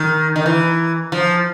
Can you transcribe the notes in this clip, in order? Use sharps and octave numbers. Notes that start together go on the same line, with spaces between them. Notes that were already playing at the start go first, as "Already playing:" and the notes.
Already playing: D#3
D#3
E3
F3